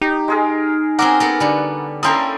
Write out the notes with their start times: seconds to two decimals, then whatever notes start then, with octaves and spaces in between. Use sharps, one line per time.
0.01 D#4 G4
0.28 G#3 G#4 A#4
0.99 C4 C#4 G#4 A#4 F#5 A#5 D6 E6
1.20 B3 A4 A#4
1.40 D3 G3 B3
2.03 A#3 C#4 E4 A4 G5 A#5 C6 D#6